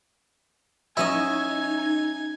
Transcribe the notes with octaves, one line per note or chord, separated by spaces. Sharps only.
F#3 C#4 D#4 E4 D#5 G#5 G#6